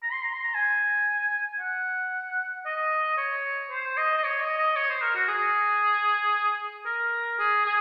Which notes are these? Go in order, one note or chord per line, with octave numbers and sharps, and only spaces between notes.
A#5
C6
A#5
C6
A#5
G#5
F#5
D#5
C#5
C5
D#5
D#5
C#5
D#5
D#5
C#5
C5
A#4
F#4
G#4
A#4
G#4
G#4